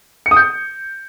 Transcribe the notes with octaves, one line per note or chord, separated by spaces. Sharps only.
C#7
D#6
G6